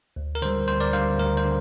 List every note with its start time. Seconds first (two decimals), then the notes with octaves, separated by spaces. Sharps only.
0.16 D2
0.35 A#4
0.42 D3 G3 C5
0.68 D2 C5
0.80 A#4 D5
0.93 D3 G3 C5 F5
1.19 D2 A#4
1.37 C5
1.45 D3